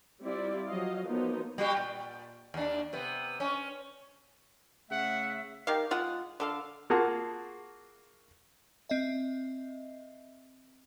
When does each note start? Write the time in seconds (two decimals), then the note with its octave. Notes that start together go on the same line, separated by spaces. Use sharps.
0.21 G3 C4 E4 F4 D5
0.66 F3 F#3 D#5 F5
1.07 F3 F#3 A#3 B3 D#4
1.58 G3 F#4 G4
1.77 A#2
2.54 D#2 D4
2.93 C3 B3
3.40 C#4
4.91 C#3 A3 E5 F#5
5.67 D#3 G4 F5
5.91 G#3 F4 F#5
6.40 D3 A4 F5
6.90 A#3 F4 F#4 G#4 A5
8.89 C4 D#5 E5